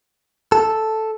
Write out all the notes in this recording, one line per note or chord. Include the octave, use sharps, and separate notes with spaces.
A4